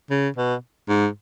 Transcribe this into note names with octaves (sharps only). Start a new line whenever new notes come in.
C#3
B2
G#2